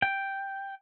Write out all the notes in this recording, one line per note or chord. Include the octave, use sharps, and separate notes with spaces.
G5